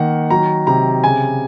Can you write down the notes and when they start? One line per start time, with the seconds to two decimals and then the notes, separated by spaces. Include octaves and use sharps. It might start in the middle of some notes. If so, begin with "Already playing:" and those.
Already playing: D#3 A#3 F#5
0.30 F#3 A#5
0.67 C3 A#5
1.04 C#3 G#5